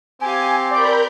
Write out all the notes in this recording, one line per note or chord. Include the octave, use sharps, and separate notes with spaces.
C4 G4 F5 G#5
A#4 D5 B5 G6